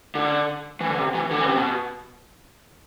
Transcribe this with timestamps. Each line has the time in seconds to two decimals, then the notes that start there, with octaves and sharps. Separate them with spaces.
0.15 D3
0.81 E3
0.89 D3
0.98 C3
1.14 E3
1.31 D3
1.39 E3
1.47 C3
1.55 B2